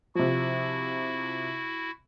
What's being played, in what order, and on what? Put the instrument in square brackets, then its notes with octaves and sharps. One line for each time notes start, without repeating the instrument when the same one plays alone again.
[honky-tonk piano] C3 F3 [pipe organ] E4 F#4